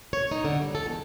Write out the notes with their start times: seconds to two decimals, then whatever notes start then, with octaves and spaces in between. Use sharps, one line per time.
0.13 C#5
0.31 D#4
0.45 D3
0.62 G3
0.75 A4
0.86 E2